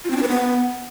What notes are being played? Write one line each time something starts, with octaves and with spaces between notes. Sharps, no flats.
F4
C4
D4
B4
B3